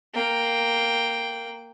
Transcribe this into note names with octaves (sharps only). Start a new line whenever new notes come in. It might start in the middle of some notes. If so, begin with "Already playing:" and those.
A#3 G5